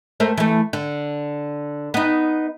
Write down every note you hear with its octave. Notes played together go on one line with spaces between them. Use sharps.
A3 A#4 C5
E3 A3
D3
B3 D#4